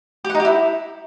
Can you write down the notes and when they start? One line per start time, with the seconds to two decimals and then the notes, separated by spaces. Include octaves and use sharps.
0.24 G4
0.30 F#5
0.35 D#4
0.40 G4
0.45 E4